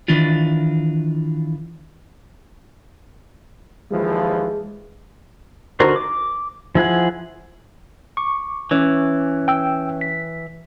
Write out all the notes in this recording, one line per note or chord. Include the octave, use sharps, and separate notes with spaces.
D#3 E3 D4 F4
D#2 E3 F3 G#3
D3 D#4 F#4 A#4 C5
D6
F3 E4 G#4 F#5
C#6 D6
E3 C#4
G5 E6
B6